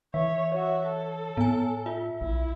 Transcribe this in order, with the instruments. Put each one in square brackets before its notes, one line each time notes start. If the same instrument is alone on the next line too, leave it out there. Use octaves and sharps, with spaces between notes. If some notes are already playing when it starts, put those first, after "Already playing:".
[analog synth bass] E3 [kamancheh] C#5 [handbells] E5
[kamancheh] F#4 E5 [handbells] C#5
[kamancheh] A4
[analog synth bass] A2 [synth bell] B3 G#5
[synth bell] F4 [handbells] E5
[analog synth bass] B1 [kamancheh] E4